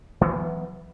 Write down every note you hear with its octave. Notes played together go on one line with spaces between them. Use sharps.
E3 F#3 B3